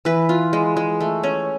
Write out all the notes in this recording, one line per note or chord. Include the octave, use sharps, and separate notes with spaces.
E3 B4
F4
G#3
G#3
A3
C#4